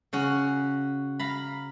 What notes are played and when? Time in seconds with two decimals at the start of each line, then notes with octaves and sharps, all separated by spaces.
0.13 C#3 C#4 F#4
1.19 F5 A#5 B5